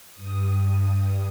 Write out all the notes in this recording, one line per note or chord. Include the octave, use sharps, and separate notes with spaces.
G2 D#6